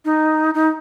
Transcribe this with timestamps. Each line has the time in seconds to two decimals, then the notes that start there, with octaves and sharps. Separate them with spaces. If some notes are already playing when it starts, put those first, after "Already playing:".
0.05 D#4
0.54 D#4